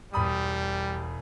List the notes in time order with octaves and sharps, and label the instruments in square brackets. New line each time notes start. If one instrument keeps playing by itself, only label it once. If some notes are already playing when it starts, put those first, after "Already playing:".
[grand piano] E1 B5 D#6 [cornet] G3